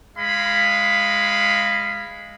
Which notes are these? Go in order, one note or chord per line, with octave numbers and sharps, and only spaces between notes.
G#3 F5 B5